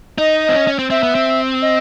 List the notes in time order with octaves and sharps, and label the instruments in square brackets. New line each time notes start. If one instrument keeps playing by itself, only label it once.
[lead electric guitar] D#4 [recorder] D#5
[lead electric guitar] C4
C#4
C#4
C4
[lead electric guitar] C4 [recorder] E5
[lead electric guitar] B3
C4
[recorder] D#5